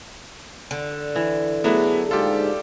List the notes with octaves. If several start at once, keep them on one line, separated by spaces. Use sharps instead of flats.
D3
E3
F#3 A3 B3 D4 E4 G#4
D#2 G#2 F4 G4 A4